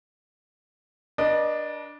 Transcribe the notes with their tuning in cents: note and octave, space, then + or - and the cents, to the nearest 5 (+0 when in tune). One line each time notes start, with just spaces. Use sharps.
D4 +0 B4 -45 D#5 -20